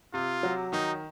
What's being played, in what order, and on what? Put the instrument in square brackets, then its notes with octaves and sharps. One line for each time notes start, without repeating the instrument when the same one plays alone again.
[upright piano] C3 [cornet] F4
[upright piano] F#3
[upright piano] D#3 [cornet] D#4